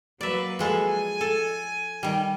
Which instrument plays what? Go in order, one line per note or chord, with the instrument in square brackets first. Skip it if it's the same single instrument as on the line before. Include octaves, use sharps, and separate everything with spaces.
[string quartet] F#3 A#3 B4 [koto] D5 E5
[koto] F3 G#3 A4
[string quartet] G#5
[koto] A4
D#3 G3